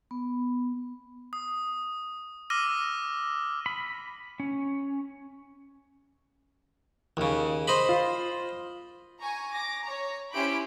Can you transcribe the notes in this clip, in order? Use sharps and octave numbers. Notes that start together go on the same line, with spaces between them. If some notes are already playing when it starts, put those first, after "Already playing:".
B3
D#6
D6 E6 F6 A#6 D#7
B5
C#4
D#2 C#3
C5 D#5 B5
F4
G#5 A#5 C#6
D6 A#6
C#5 A#5
C#4 E4 G4 C5 B5 D7